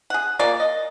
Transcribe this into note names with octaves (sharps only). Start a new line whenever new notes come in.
G#4 F#5
A#3 F4 G#4 D5
D#5